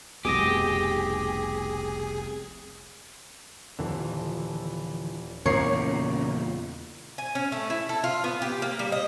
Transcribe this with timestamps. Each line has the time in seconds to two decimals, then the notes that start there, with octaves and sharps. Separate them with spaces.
0.25 F1 C2 B2 G4 G#4 D6 D#6 A#6
3.79 D#1 D3 E3 F3
5.46 E2 A#2 C#3 A#4 C#5 D5 C7
7.18 G#5
7.35 C#4
7.52 A3
7.70 E4
7.89 A4
8.04 F4
8.24 B3
8.42 G4
8.62 A#3
8.79 G3
8.92 D#5